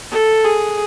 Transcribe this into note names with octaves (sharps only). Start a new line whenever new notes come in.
A4
G#4